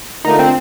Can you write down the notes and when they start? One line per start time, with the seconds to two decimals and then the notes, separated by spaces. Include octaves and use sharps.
0.24 D3 A3 D4 D#4 F4 A#4
0.39 C4